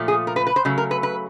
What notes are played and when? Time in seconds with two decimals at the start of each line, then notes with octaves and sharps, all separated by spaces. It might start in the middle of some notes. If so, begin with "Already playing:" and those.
Already playing: A#2 F3 A3
0.08 G#4
0.27 A#4
0.36 B4
0.47 B4
0.56 C5
0.65 C#3 F#3 A3
0.78 A#4
0.91 B4
1.03 B4